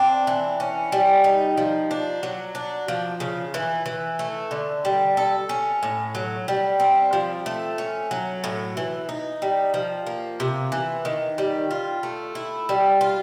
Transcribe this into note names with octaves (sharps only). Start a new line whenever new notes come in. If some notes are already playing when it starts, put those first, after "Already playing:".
Already playing: C4 D4
E3
C#4
G3
D#4
F3
D4
F#3
D4
F3
C#3
E3
E3
A3
D3
G3
A4
C#4
A2
F#3
G3
C4
F3
A3
C#4
F#3
A2
E3
D#4
G3
F3
A#3
C3
E3
D#3
G3
F4
A3
E4
G3
F4